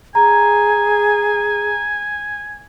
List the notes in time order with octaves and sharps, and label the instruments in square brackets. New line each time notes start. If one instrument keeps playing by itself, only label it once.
[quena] G#4 [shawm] G#5 [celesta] A#5